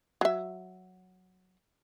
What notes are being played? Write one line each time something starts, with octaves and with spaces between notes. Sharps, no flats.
F#3 E5